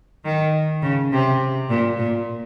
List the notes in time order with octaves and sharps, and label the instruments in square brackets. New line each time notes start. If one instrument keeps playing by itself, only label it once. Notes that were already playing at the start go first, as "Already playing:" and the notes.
[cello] D#3
C#3
C3
A#2
A#2